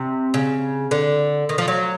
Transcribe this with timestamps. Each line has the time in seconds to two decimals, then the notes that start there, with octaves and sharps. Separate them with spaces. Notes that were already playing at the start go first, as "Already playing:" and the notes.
Already playing: C3
0.34 C#3
0.91 D3
1.49 D#3
1.58 F3
1.68 F#3